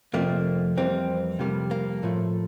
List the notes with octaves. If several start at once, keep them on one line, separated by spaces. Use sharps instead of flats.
F2 C3 F3 A3 A#3
F2 E3 G3 A#3 C4
F2 C3 G3 A#3
A#3
A2 F3 A3